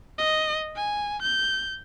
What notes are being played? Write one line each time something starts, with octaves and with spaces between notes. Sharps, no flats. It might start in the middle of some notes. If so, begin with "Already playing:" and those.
D#5
G#5
G6